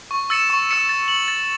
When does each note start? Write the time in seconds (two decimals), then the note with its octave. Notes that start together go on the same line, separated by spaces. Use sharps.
0.11 C#6
0.30 E6 A6 C#7 E7
0.50 C#6
0.69 E6 A6 C#7 E7
0.89 A6
1.08 F#7
1.28 A6